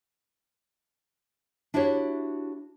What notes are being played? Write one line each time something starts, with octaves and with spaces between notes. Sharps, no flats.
D4 E4 F#4 G4 C#5